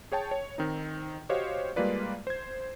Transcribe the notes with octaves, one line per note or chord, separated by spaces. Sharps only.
G#4 C#5 G5 A5
C#5
D#3 C4 D#4
F#4 G4 C5 C#5 D#5 F5
G3 G#3 A#3 F4 B4 D5
C5 G#6